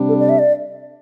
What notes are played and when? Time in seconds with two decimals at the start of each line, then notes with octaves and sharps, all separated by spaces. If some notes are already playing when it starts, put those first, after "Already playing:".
Already playing: C3 G3 D4
0.09 A4
0.20 D5
0.29 E5
0.39 D5